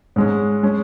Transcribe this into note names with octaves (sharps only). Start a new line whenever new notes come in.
G#2 G#3 C#4
G#3 C#4